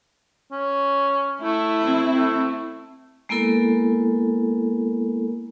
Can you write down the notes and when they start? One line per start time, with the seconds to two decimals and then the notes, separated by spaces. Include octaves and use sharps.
0.52 C#4
1.42 A3 E4
1.82 C4
2.15 A3
3.29 G#3 A#3 B3 E4 A4 A#4